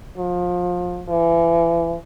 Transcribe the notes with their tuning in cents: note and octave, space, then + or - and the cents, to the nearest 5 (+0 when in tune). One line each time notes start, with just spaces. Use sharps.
F3 +25
E3 +30